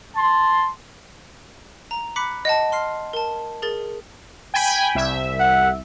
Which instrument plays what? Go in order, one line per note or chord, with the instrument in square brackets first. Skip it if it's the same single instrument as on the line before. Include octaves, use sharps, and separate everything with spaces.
[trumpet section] A5 C6
[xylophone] A#5
B5 D6 F#6 B6 C#7
D#5 F#5 A5
C6 F6 C7
A#4 A5
G#4 A#4 A6
[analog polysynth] G5 G#5 B5
C2 E5
[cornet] F#5